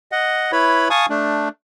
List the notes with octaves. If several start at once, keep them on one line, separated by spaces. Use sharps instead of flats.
D#5 F#5
E4 B4 C#5 B5
F5 G#5 A5 C#6 D#6
A3 D4